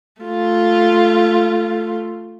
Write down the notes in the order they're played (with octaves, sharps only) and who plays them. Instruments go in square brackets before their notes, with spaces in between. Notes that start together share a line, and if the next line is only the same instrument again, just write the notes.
[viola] A3 F4